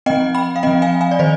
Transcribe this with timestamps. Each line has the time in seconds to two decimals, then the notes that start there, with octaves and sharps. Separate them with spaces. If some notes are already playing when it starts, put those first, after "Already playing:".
0.06 C4 D#5 G5
0.10 F3
0.35 G5 B5
0.56 F5
0.63 F3 C4 D#5 G5
0.82 F5 G#5
1.01 F5 G#5
1.11 D5
1.19 D#3 C5 D#5